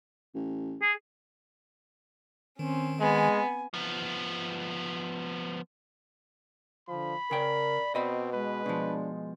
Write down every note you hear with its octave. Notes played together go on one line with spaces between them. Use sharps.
A1
G#4
D#3 C4 C#4
G#3 B3 G#5
F3 B3
D3 F3 B5
C#3 A#4 D5 G5
B2 C4 D#5 B5
G#3 B4
B2 F3 D4